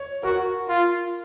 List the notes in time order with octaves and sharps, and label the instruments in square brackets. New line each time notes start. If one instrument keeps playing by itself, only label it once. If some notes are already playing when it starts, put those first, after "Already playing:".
Already playing: [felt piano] C#5
[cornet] F#4 [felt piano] A#4
[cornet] F4